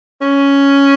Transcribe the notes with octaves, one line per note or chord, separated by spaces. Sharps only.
C#4